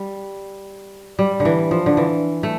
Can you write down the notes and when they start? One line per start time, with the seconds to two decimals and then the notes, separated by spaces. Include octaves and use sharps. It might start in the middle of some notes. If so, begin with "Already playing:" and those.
Already playing: G3
1.19 G3
1.40 D3
1.45 E3
1.71 F3
1.86 D3
1.97 E3
2.43 A3